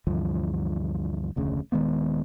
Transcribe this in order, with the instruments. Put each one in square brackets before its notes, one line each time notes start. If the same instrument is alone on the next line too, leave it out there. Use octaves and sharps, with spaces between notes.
[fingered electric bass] D2 G2 E3 F3
F1 D2 C#3
D#1 D#3 G#3 B3